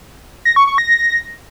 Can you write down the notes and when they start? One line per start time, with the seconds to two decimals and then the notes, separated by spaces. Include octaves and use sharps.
0.45 A#6
0.56 C#6
0.67 C#6
0.78 A#6